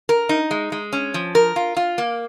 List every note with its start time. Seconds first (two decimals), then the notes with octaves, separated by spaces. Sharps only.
0.09 A#4
0.29 D#4
0.51 G#3
0.72 G#3
0.93 C#4
1.14 F3
1.35 A#4
1.56 F4
1.77 F4
1.98 A#3